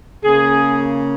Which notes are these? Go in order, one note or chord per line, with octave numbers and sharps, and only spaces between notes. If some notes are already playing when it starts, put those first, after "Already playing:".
C#3 A#3 G#4